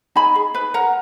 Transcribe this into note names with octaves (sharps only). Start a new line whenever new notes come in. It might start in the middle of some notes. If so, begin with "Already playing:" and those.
D#4 G#5 B5
G#4
B4
A#4 F#5 A#5